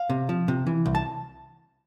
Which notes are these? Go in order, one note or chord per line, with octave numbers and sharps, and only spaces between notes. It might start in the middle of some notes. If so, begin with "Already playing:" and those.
Already playing: F5
C3
F3
C3
E3
C2
A5